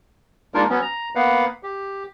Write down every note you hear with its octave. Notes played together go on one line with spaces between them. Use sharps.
G#3 A#3 D4 D#4 F4 A#4
F#3 B3 C#4
A#5
A#3 B3 B4 F5 F#5
G4